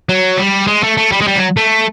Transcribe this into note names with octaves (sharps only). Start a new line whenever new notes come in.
F#3
G3
G#3
A3
A3
G3
G#3
G3
F#3
A3